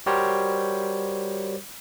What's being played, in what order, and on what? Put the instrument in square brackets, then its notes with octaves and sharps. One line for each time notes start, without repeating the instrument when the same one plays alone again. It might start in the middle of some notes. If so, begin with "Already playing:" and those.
[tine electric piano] G3 F#4 G4 A#4 C5 C#5